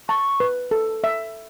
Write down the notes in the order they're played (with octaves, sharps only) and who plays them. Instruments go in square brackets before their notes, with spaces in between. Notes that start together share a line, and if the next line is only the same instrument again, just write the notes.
[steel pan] A5 [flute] C#6
[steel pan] B4
A4
E5